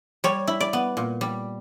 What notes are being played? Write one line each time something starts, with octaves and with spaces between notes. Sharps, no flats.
G3 C#5
E4
D5
B3
A#2
G3